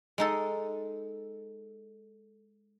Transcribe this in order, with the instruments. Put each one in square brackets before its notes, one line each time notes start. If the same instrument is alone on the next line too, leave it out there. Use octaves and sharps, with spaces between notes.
[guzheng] G#3 D#4 A4